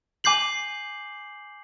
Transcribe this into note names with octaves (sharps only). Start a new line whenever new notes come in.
G#5 D6 G6 C7 F#7